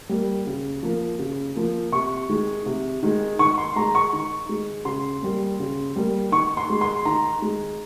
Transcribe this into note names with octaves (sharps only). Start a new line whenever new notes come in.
G3 A#3
C#3
F3 A#3
C#3
F3 A#3
C3 C#6
D#3 G#3
C3
D#3 G#3
D#3 C#6
C6
G#3 A#5
C#6
D#3
G#3
C#3 C6
G3 A#3
C#3
G3 A#3
D#3 C#6
C6
G#3
C6
D#3 A#5
G#3